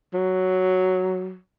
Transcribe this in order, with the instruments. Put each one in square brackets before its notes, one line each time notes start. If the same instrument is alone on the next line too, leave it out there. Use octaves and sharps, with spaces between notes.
[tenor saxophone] F#3